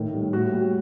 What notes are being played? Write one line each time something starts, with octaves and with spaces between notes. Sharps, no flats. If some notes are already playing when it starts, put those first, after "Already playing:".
Already playing: A2 D#3
G3
A2 F#4
G3